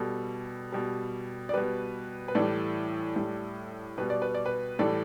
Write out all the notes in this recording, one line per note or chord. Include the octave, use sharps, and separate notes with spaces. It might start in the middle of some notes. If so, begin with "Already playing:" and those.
Already playing: B2 G3 A4
B2 G3
D5
B2 G3 B4
B4
A2 E3 G3 A4 D5
A2 G3
B2 G3 B4
D5
B4
D5
B4
A2 E3 G3 A4 D5